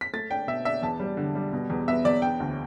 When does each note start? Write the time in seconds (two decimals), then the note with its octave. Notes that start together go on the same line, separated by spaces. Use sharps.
0.01 B6
0.13 A3 A6
0.31 D4 G5
0.47 B2 E5
0.65 D4 E5
0.82 E2 A5
1.00 G3
1.17 D3
1.35 G3
1.53 B2
1.70 E2
1.88 B3 E5
2.05 E2 D5
2.22 D4 G5
2.40 D2